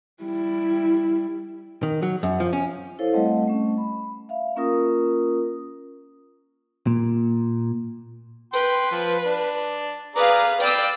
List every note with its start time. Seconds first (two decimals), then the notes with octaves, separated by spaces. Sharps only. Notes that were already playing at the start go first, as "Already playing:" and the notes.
0.23 G3 E4
1.83 D#3
2.02 F#3
2.23 F#2
2.40 F3
2.53 C#4
2.99 E4 A4 C5 C#5 F5
3.13 G3 A3 C4 D#5 F#5
3.47 A3 C#4
3.78 B5
4.29 E5 F5
4.56 A#3 C#4 F4 A#4 D#6
6.87 A#2
8.53 B4 G5 C6
8.91 F3
9.26 D4
10.16 G#4 B4 D5 F5 A#5
10.61 B4 D5 F5 G5 E6